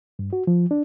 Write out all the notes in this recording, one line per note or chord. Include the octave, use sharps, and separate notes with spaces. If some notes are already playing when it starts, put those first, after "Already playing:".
G2
F#4
F3
D4